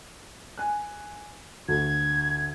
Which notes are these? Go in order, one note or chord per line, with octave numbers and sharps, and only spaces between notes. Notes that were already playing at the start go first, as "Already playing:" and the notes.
G#5 F#6
D2 G#6